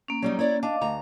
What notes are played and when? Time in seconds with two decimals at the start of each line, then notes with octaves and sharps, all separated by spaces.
0.08 A#3 C#4
0.22 F#3 G3 D#4
0.39 E4 C#5 D5
0.63 D4 D#5 F5 D6
0.81 D2 A#5